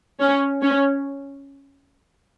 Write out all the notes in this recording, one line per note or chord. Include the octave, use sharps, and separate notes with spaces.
C#4
C#4